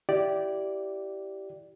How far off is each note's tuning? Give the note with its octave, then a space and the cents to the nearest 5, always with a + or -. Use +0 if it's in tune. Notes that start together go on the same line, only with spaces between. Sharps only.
E4 +5 G4 -15 D5 +0